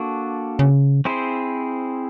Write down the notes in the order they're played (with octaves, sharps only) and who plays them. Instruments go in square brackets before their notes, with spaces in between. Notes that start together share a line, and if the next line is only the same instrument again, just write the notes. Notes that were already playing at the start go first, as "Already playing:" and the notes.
Already playing: [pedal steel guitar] A#3 D4 F#4 A4
[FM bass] C#3
[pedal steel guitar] C4 E4 G#4 C5